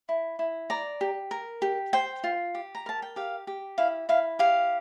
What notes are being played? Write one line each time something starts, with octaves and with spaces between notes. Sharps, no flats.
E4
E4
D5 A#5
G4
A#4
G4
C5 G5
F4
G4
A#5
A#4 A5
G5
G4 F5
G4
E4 F5
E4 F5
G4 F5